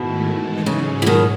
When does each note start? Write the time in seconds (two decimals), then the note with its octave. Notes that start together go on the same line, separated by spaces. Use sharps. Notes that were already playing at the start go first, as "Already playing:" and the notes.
Already playing: G#2 B2 D#3 A3 E4
0.27 E3 G#3 D#4 A4
0.66 G#2 C#3 F#3 C#4 G#4
1.02 E3
1.06 G#2 B2 D#3